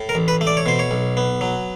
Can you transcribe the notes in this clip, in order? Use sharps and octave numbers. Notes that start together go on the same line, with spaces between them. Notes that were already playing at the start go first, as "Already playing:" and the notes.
Already playing: A2
A#4
A1
B4
A3
D5
C#5
B2 C5
C#5
B1
B3
F#3